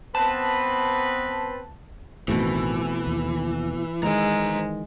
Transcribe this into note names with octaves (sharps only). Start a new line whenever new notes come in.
B3 C4 B4 A5
A1 B2 D#3 E3 A3 C4
D#2
D#3 E3 G#3 C5 A#5